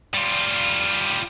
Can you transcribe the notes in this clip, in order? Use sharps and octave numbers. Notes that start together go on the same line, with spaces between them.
G3 F4